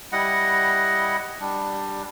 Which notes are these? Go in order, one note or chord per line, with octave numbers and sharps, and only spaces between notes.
G3 E4 D#5 F#5
G3 D4